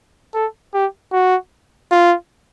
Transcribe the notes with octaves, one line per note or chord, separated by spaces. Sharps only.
A4
G4
F#4
F4